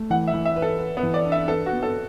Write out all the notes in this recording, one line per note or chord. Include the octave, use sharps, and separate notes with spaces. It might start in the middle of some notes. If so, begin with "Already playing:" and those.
Already playing: A3
E3 F#5
E5
E3
E5
B4
A4
B4
B3
E3
D5
D4
E5
A4 B4
F#4
B3
A4